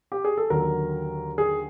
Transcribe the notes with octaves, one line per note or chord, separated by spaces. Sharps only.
G4
G#4
A4
D#2 D3 F#3 A#4
G#4